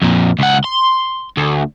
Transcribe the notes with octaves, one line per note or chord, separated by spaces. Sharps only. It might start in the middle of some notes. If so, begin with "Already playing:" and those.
F2 A#2
C#2 F#5
C6
D2